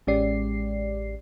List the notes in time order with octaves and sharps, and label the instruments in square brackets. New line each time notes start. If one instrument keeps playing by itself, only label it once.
[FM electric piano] A1 G#3 C#4 G4 D5 C7